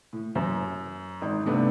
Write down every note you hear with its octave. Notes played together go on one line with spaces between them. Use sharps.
A2
F#2
G#1
G2 C3 A3 B3 D4